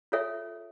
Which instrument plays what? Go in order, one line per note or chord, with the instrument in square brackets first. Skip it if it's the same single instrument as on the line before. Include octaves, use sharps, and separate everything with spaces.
[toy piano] F4 A4 C#5 E5